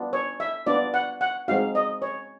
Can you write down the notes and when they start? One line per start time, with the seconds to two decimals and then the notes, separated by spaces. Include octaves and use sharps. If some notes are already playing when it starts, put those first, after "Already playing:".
Already playing: B3 D4 F4
0.13 C#5
0.40 E5
0.66 B3 D4 F4 D5
0.94 F#5
1.21 F#5
1.48 G#3 C4 D#4 F#4 F5
1.75 D#5
2.02 C#5